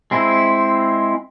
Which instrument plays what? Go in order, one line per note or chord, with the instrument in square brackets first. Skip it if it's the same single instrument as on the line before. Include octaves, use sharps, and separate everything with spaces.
[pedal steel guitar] G#3 C4 E4